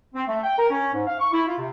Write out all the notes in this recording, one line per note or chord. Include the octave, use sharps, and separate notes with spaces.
C4
A3
G5
A#4
C#4
G#2
F5
C#6
E4
F4
C3